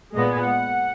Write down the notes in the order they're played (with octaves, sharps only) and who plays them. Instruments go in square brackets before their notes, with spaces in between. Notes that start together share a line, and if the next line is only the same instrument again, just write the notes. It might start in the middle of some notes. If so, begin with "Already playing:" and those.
[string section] A#2 G#3 B3 [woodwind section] D#5
[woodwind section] G#5
F#5